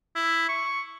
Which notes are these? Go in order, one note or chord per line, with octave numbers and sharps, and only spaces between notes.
E4
C#6